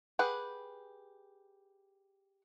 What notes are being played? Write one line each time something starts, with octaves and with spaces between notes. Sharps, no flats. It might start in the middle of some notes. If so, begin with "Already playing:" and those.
G4 G#4 B4 F#5